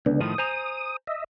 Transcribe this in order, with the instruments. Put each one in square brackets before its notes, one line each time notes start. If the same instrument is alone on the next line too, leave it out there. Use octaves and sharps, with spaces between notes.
[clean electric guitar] C#2 [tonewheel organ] D3 B3 D4
[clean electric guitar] A2 D#3 F3 [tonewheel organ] D#6
[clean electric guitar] C5 G#5 A#5
[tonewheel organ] D#5 E5